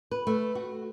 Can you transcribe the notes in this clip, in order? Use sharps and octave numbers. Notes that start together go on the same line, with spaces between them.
B4
A3
F#4